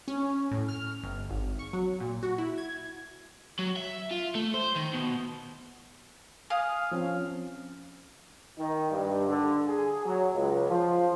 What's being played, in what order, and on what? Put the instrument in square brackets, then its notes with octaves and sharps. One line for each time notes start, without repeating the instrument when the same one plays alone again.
[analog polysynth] C#4
A2
F6
G1
G#1
C#6
F#3
A#2
F#4
E4
G#6
[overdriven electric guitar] F#3
E5
F4
A3
C5
D#3
B2
[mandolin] F5 D#6 [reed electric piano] G#5
[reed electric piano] F3 C4 C#4
[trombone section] D#3
G2
D3
G#4
F#3
C#2
F3